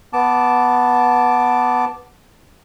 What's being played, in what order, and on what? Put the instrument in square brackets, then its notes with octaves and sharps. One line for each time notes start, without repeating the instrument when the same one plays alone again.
[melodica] B3 A5 D6